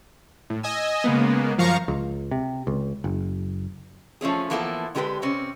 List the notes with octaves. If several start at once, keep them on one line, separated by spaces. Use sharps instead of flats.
A2
D#5 G#5 E6
C#3 G#3 A#3 B3
F#2 F3 F5 A#5 C#6
C#2
C3
C#2
F#1
F3 A3 C#4 G#4
E3 F3 A#3 B3 E4 A4
D3 G#3 G4 A#4 B4
C3 C4 C#4